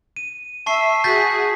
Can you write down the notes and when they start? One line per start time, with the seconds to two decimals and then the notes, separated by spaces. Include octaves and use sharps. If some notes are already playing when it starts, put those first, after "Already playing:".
0.16 D#7
0.66 E5 A5 C#6 C7
1.04 F#4 G#4 G6 A6 B6